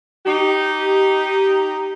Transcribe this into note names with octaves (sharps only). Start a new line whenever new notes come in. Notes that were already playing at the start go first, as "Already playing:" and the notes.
D#4 G4